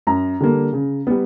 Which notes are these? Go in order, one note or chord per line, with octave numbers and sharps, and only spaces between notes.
F#2 A#5
D3 G3 A#3
C#3
G3 B3